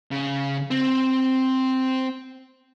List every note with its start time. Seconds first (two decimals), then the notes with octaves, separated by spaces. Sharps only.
0.11 C#3
0.71 C4